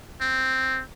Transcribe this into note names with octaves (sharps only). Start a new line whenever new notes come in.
C4